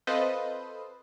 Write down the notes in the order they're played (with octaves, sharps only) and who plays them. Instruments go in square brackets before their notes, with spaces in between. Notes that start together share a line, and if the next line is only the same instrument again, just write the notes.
[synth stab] C4 F4 A4 B4 C5 D#5